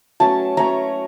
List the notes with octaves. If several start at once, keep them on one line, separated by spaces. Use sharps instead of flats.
F#3 A3 C#4 A5
F#3 A3 C#4 A#5